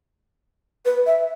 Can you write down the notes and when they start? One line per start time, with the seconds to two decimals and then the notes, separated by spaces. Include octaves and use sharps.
0.85 B4
1.06 E5